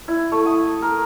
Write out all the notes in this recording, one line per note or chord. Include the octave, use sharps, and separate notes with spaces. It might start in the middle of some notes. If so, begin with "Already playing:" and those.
E4
A3
D#6
A#4